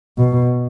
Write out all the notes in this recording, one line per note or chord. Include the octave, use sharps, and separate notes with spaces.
B2